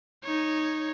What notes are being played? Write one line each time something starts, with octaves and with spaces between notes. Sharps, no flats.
D#4 C#5